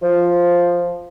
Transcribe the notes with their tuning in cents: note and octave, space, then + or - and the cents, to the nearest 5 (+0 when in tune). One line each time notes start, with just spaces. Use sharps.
F3 +0